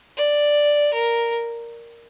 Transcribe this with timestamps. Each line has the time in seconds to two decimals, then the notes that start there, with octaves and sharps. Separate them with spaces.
0.17 D5
0.94 A#4